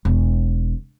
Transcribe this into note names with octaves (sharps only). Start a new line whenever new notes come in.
E1